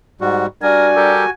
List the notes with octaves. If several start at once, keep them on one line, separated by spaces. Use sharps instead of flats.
G#2 G3 F#4
G3 D4 F#4 A#4 G#5
G3 G4 A4 A#4